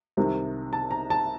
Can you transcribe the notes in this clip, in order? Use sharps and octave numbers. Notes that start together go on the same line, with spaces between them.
C2 C3 D#3
A5
A#5
A5